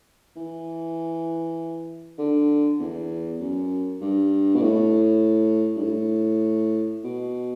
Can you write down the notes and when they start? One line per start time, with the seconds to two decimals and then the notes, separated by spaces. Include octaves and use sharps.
0.36 E3
2.18 D3
2.80 E2
3.40 F#2
4.01 G2
4.55 B2
4.61 A2
5.76 G2
5.83 A2
7.04 B2